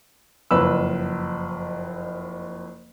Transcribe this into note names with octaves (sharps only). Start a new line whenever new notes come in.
F#1 F2 B4 E6